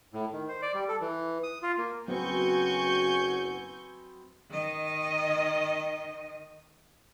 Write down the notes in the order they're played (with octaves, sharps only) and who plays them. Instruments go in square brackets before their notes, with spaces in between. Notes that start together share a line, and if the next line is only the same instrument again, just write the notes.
[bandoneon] A2
D#3
C5
D5
G3
A4
E3
D#6
F4
A#3
[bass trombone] F#1 [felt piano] F#3 B3 C4 [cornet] F#4 [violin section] G#5 C#6 G6
[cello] D#3 D#5